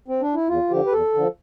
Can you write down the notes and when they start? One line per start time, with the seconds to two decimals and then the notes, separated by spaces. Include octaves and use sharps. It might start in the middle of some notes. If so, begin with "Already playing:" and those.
0.08 C4
0.21 D4
0.35 E4
0.49 E2 F4
0.70 D3 F3 G4
0.87 B4
0.92 E2 A4
1.14 D3 F3